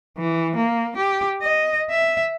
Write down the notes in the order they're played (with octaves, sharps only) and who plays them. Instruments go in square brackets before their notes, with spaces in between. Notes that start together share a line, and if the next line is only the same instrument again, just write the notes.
[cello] E3
A#3
G4
D#5
E5